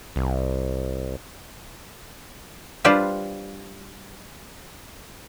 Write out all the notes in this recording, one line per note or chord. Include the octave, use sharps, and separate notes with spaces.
C2
G3 D4 F4 G4 B4 C5